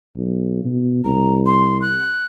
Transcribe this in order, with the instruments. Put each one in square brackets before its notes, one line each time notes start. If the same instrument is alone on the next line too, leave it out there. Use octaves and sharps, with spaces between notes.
[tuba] B1
B2
[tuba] C2 [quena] A#5
[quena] C6
F#6